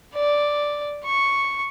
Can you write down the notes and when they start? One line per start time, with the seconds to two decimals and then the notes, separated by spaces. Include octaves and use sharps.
0.14 D5
1.05 C#6